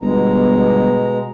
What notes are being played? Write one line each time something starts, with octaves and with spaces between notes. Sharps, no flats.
G1 B2 G#3 A#5